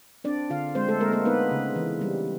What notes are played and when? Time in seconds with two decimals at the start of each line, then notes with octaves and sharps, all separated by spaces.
0.24 C4 D4 D5
0.50 D3 F4 F5
0.75 G#3 C4 C5
0.88 A3 A4
1.00 G#3 A#3 A#4
1.13 A#3 A#4
1.25 B3 D#4 B4
1.51 C#3
1.76 E3
2.01 G3